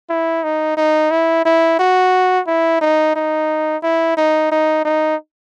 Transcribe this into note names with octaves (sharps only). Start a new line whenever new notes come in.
E4
D#4
D#4
E4
E4
F#4
E4
D#4
D#4
E4
D#4
D#4
D#4